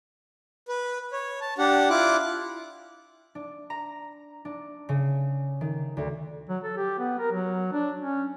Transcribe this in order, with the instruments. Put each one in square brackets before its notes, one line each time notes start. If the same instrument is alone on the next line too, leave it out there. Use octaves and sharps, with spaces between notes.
[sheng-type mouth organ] B4
C#5
A5
D4 G4 F#5
E4 F4 D6 F#6
[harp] D4
A#5
D4
C#3
D#3
D2
[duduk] F#3
A4
G4
B3
A#4
F#3
D4
C#4